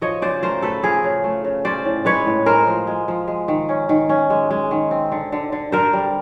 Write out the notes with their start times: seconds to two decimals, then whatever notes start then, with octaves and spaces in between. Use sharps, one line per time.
0.02 F3 C#5 D#5
0.22 C#3 C5 D5
0.42 A3 A#4 C5
0.62 A3 A4 B4
0.83 F3 G#4 A#4
1.04 C#3
1.24 A3
1.44 C#3
1.65 C#4 C5 D5
1.85 A2
2.05 G#3 B4 C#5
2.26 A2
2.46 G#3 A#4 C5
2.67 F3
2.87 G#3
3.08 F3
3.27 G#3
3.48 D#3
3.69 C#4
3.89 D#3
4.09 C#4
4.30 G#3
4.51 G#3
4.71 D#3
4.91 C4
5.12 D3
5.32 D3
5.52 D3
5.72 D3 A#4 C5
5.93 G3